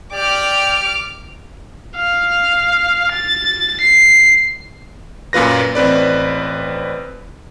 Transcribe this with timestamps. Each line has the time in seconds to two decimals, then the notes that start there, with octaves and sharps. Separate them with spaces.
0.12 G4 D5 G5 D6 F6
1.97 F5
3.12 A6
3.81 C7
5.33 F#2 A#2 F4 B4 A#6
5.75 A1 C4 B4 D5